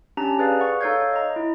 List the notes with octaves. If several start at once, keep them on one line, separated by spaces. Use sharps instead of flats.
C#4 D4 G4 A5 A#5
G#4 B4 D5 F5
F#5 C#6
D#4 A4 C#5 F5 G6 G#6
D#5 A#5
E4